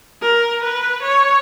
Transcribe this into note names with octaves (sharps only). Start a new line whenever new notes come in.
A#4
B4
C#5